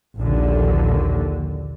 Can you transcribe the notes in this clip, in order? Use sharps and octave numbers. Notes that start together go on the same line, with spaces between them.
A#1 D#2 D3